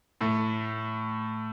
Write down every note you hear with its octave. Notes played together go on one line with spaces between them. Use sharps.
A2 A3